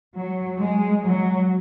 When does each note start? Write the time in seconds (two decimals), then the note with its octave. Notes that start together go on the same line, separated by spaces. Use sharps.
0.16 F#3
0.60 G#3
1.04 F#3